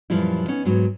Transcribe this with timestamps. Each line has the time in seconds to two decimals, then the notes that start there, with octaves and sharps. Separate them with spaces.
0.10 F#2 A#2 E3 F3 G3 E4
0.48 B3 C#4 D#4
0.65 G#2 F#3 B3